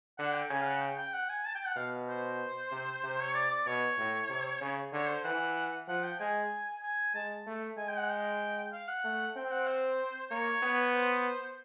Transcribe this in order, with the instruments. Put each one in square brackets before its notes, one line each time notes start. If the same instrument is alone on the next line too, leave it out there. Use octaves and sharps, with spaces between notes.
[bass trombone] D3 [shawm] F#5
[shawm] G5
[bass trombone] C#3 [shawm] G#5
[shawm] F5
F#5
G5
G5
F#5
G#5
A5
G5
F#5
[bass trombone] B2 [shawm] F5
[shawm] C5
[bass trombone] C3
C3
[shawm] C#5
D5
D5
[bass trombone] B2 [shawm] C#5
[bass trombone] A2
C3
C#3
[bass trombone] D3 [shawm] C#5
[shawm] C5
[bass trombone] E3 [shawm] F#5
[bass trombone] F3 [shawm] F#5
[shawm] G5
[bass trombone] G#3 [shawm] G#5
[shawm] G#5
[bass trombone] G#3 [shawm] A5
[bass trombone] A3
[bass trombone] G#3 [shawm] G#5
[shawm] G5
F#5
G5
F5
F#5
[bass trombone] A3
[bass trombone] C4 [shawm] G5
[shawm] F#5
C5
[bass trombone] A#3 [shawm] C#5
[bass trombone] B3
[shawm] C5